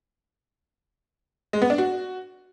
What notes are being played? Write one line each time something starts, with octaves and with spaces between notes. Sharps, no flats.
G#3
B3
D4
F#4